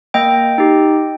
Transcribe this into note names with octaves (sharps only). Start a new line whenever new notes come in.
A#3 D#5 G5
D#4 G4